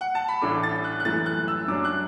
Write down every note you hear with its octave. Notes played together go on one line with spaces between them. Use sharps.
F#5
A5
B5
A1 A2 A3 D4 D6
A6
F#6
F#6
F#2 E3 A3 A6
F#6
E6
F#2 F#3 D4 D6
F#6